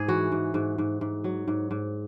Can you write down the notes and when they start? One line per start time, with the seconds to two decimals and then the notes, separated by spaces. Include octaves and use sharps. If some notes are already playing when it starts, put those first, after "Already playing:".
Already playing: G#2 G#4
0.08 E3 F#4
0.32 G#2
0.54 G#2
0.78 G#2
1.01 G#2
1.24 F#3
1.48 G#2
1.71 G#2